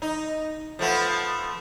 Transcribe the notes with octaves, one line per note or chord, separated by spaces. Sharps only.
D#4
F3 A3 B3